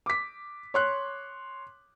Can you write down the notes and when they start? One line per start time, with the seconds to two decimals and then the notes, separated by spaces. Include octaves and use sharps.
0.06 D6 B6
0.74 C#5 C6 F#6